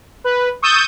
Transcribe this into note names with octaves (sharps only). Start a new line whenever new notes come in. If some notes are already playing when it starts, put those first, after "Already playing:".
B4
C#6 D#6 E6 G6 A6 D#7